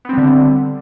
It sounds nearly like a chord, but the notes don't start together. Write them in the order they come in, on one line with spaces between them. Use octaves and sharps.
B3 C4 G3 D3